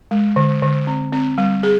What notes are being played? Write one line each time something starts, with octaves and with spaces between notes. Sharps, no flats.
G#3
D3
D3
C4
C4
G3
G#4